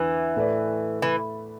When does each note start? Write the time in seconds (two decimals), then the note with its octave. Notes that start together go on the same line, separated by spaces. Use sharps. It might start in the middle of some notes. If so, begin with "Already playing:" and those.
Already playing: E2 D3 E3
0.36 A2 A3 E4 B4 D5
1.02 E3